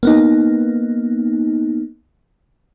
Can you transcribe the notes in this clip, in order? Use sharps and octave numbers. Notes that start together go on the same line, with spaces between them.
A#3 B3 D#4